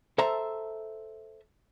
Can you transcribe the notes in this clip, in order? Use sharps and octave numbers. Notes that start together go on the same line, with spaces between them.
A4 C5 E5 A5 A#5